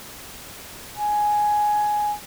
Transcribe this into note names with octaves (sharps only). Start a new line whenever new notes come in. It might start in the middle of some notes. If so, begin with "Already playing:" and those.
G#5